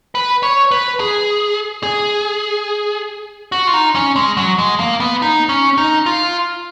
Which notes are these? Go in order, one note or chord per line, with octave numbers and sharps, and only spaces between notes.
B4
C#5
B4
G#4
G#4
F#4
F4
D#4
C#4
G#3
F#3
G#3
A#3
B3
D#4
C#4
D#4
F4